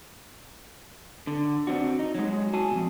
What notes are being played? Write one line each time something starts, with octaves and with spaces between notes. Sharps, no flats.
D3
C4 D4 F#4
D#4
F#3 G#3
F#4 G#5 A5
F2 A#2